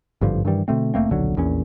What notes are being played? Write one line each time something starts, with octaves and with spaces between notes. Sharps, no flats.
G#1 G2 D3 F3
G2 D#3 E3 G3
B2 D3 A3 C4
F1 A3 A#3 C4
D#1 B1 D3 F#3
A#1 E2 A#2 C#4